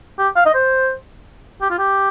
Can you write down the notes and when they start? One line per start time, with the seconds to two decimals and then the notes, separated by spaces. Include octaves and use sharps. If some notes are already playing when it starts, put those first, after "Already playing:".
0.19 G4
0.36 F5
0.46 D#5
0.54 C5
1.62 G4
1.70 F4
1.79 G4